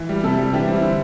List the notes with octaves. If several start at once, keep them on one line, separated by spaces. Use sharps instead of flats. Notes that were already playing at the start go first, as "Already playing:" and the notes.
Already playing: E3
G3
C3 E4 A4
G3
E3 D4 G4
G3 C4 E4
D3